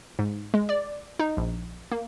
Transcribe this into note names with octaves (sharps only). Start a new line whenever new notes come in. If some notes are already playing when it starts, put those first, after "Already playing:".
G#2
G#3
D5
D#4
A#1
A#3